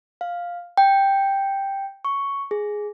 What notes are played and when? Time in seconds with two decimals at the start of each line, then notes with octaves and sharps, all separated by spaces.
0.21 F5
0.77 G5
2.05 C#6
2.51 G#4